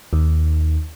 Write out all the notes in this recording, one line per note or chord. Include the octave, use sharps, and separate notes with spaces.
D#2